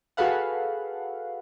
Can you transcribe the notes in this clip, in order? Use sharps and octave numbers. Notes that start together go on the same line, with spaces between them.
F#4 G#4 A4 B4 F5 F#5